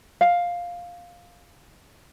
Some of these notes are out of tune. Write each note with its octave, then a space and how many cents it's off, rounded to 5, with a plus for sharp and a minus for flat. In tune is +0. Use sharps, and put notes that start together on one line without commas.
F5 +5